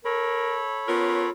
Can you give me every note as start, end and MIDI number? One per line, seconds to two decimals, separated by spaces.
0.05 1.30 69
0.05 0.64 70
0.05 1.30 73
0.05 1.30 83
0.89 1.27 59
0.89 1.27 61
0.89 1.33 65
0.89 1.27 70